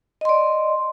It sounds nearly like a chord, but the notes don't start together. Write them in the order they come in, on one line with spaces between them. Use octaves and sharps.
D#5 C6 D5